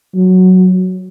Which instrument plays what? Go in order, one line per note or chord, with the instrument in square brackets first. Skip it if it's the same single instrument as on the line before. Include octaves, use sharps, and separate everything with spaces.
[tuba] F#3